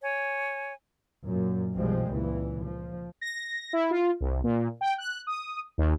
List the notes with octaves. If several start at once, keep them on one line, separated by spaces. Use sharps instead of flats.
C#5 G#5
F#2 A#2
B1 B2 F3 G3 G#3 C4
C#2 A#2 E3
F3
A#6
E4
F4
C2
A#2
G5
F#6
D#6
D#2